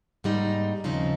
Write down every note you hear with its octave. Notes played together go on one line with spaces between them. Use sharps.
G#2 G3 A#3 D#4
D#2 C#3 F3 C4 D#4